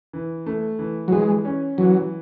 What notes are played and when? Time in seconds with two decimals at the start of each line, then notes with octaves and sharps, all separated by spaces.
0.13 E3
0.46 A3
0.79 E3
1.08 F#3
1.12 E3 G#3
1.45 C#4
1.78 E3 F#3